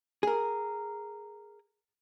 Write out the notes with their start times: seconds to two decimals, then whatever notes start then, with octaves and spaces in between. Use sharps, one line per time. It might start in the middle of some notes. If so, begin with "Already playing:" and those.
0.23 G#4 A#4